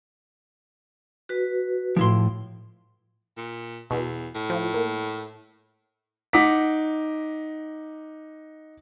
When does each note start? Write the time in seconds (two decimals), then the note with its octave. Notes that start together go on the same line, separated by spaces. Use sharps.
1.29 F#4 B4
1.96 A2 F3 E4 C6
3.37 A#2
3.91 E2 B2
4.35 A2
4.50 F3
4.74 A#3
6.33 D#4 F#5 D6 B6